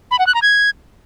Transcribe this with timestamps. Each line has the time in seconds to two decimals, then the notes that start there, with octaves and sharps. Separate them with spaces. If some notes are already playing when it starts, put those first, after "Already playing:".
0.11 B5
0.19 F#5
0.27 F#6
0.34 A#5
0.42 G#6